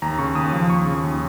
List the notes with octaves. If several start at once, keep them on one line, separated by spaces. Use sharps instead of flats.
D#2 A#5
C#3 C#6
D#2 D#6
F3
D#2 C#6
C#3
D#2